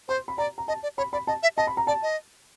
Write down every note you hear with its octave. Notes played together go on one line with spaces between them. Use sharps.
C5 C6
B5
D5 A#5
A#5
D#5 A5
D5
C#5 B5
D5 B5
D#5 A5
E5
D#5 A5
B5
A#5
D5 A5
D#5